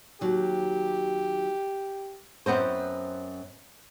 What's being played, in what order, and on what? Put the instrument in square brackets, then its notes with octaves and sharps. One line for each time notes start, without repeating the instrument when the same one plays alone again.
[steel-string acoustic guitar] D#2 F#3 [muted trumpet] G4
[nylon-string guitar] F#2 B3 C4 C5